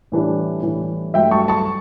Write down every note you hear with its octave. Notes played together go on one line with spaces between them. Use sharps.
A2 E3 G3 D4
A2 E3 G3 D4
G2 F#3 A3 E5 G5
A5 C#6
A5 C#6